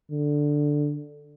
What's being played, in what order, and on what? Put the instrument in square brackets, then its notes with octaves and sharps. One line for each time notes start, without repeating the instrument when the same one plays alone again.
[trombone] D3